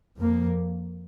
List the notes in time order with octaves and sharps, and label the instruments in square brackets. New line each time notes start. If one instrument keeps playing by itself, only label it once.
[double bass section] F2 F3 A#3